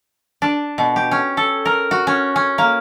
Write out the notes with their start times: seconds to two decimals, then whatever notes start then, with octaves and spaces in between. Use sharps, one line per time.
0.42 D4
0.78 B2
0.96 G4
1.11 C#4
1.37 A4
1.65 A#4
1.91 F#4
2.07 C#4
2.36 C#4
2.58 A#3